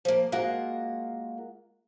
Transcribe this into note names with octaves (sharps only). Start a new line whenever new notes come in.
F3 A#3
G#3 A#3 F4 F#4 A#4